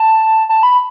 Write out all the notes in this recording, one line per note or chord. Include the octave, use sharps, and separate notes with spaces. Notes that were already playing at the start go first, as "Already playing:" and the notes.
Already playing: A5
A5
B5